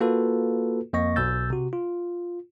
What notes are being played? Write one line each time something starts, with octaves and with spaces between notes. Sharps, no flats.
A#3 F4 F#4 A4 B4
F2 A#3 D#5 C#6 A#6
B1 B2 E6 G6 A6
C3 F#4
F4